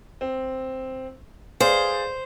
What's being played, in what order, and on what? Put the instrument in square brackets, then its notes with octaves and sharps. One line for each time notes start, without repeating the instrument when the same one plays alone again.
[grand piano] C4
[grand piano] G#4 D5 F5 [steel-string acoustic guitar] C5